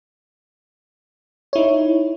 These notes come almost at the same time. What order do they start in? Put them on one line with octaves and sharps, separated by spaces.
C#5 E4 D#4